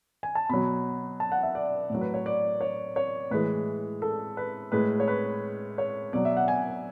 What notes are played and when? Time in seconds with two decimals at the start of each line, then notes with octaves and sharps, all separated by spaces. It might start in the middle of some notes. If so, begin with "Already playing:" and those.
0.23 G#5
0.35 A5
0.50 B2 F#3 B5
1.20 A5
1.32 F#5
1.43 E5
1.55 D5
1.90 A2 F#3
2.01 B4
2.14 C#5
2.26 D5
2.61 C#5
2.96 C#5
3.31 A2 E3 G#3 B4
4.02 A4
4.37 B4
4.72 A2 G#3 B4
5.00 C#5
5.08 B4
5.78 C#5
6.13 B2 F#3 D5
6.25 E5
6.37 F#5
6.48 G#5